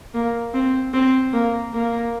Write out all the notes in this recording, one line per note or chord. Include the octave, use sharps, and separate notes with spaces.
A#3
C4
C4
A#3
A#3